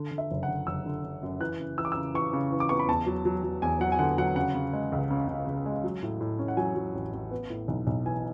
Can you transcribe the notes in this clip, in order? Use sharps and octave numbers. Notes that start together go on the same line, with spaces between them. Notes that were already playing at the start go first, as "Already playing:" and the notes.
Already playing: D3
D3
E5
F#1
F#5
D3
F#1 E6
D3
D3
F#2
E3 F#6
C#3
E3 E6
D6
E6
C#3
E3 C#6
C#3
E3
D6
B3 C#6
B5
E2 A5
F#3
F#3
F#3
E2 G#5
F#3 F#5
G#5
D3 F#5
F#3 F#5
C#3 F#5
C#3
G#3
C#2
C#3
C#3
C#3
G#3
F#3
A2
A2
C#4
F#5
F#3 G#5
F#3
A1
A1
B3
A2
B1
B1
E3 G#5